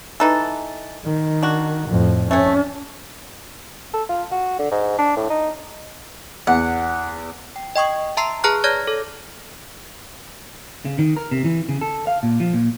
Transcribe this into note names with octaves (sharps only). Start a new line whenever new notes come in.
E3 D#4 A4
D#3
D4 F#4
F2 A2
A3 C#4 C#5
A4
F4
F#4
D3
G#2
D4
A2
D#4
E2 F#5
G5
D#5 G5 C#6 D#6
E5 A5 A#5 C6 E6 C7
G#4 B4 A5 A#5 F6 F#6
C#5 D5 F6 G6 G#6 A#6
A4
C#3
D#3
A#4
C3
E3
C#3
A4
F5
A#2
F3
A#2